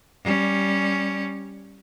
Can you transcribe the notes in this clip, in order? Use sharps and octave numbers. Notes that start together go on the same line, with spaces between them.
G3 C#4